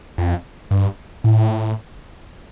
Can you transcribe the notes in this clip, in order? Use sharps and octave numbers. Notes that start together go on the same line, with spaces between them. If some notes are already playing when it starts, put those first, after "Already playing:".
F2
G2
A2